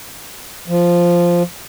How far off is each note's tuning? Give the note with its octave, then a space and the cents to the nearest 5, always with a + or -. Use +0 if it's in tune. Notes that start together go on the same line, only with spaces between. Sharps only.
F3 -5